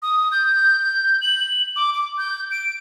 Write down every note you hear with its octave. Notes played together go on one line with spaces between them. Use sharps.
D#6
G6
F#7
D6
D6
G6
D7